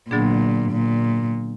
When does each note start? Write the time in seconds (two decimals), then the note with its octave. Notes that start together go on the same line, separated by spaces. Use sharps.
0.10 A#2 D3 F#3 B3 D4 G#4
0.72 A#2